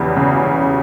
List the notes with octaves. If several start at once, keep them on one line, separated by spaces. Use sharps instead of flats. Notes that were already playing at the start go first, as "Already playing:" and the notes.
Already playing: E2 C#3 E3 G3
C#3